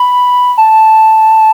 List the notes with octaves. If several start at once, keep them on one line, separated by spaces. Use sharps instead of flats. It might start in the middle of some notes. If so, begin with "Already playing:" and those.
Already playing: B5
A5